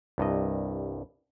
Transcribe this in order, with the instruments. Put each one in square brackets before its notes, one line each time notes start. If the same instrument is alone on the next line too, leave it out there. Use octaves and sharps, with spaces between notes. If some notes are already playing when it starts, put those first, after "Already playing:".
[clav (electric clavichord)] C2 G2 D#5